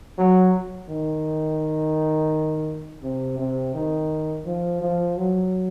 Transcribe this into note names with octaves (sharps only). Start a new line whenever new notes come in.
F#3
D#3
C3
C3
D#3
F3
F3
F#3